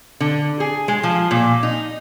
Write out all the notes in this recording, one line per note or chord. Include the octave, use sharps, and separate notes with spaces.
D3
G#4
G#3
F3
A#2
D#4